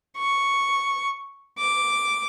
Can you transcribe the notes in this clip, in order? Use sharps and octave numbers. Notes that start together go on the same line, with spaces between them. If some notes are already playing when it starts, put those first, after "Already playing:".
C#6
D6